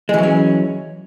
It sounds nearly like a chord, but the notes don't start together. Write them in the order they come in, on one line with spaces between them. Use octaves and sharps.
G#3 E3 F#3 C#4